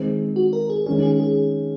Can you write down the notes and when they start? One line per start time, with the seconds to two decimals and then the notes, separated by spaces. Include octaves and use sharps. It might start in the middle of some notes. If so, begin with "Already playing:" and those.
Already playing: D#3 G#3 C4
0.36 F#4
0.53 A#4
0.70 G#4
0.86 D#3 G#3 C#4 G#4
1.03 G#4
1.20 G#4